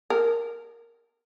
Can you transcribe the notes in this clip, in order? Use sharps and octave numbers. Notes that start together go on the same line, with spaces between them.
A#4